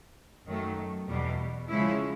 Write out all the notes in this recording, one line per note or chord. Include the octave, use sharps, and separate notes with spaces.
F#2 D#3 F#3 A3
E2 B2 G3
C#3 F3 G#3 C#4 E4